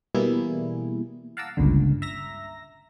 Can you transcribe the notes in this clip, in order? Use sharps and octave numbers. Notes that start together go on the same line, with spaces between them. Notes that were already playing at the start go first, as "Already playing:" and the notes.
B2 E3 G3 A#3 E4 G#4
F5 F#5 A5 A#5 D6 E6
G1 C#2 A#2 D3
E5 A#5 A#6